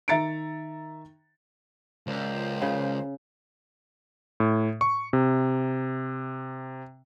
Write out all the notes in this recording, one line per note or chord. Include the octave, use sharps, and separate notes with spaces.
D#3 E5 A#5 A6 C#7 D7
C#2 A#2 F3 C5
C#3
A2
C#6
C3